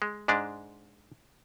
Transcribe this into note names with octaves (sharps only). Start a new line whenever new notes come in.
G#3
G#2 G#3 D4